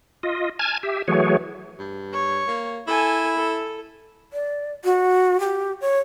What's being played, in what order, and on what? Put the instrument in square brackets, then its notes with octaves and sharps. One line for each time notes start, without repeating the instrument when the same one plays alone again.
[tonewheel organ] F4 D#5
G#5 A5 F6 G#6
G4 E5
E3 F#3 A3 F#4 G#4 C#5
[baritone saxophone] G2
[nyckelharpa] C#5
[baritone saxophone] A#3
[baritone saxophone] E4 [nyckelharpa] A4 G#5
[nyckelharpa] A4
[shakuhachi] D5
F#4
G4
C#5